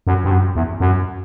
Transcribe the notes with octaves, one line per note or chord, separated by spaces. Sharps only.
F#2
G2
F#2
E2
F#2